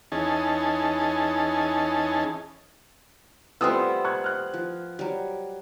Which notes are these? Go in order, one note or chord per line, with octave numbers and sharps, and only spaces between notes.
E2 C#4 D#4 G#4 A5
G3 A3 B3 C4 F4 G5 D#6 E6
C#6 F#6 G#6
F6 F#6
F3
F#3 G3